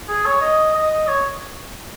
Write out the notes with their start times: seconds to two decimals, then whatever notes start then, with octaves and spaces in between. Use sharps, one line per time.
0.09 G#4
0.26 C#5
0.41 D#5
0.75 D#5
1.08 C#5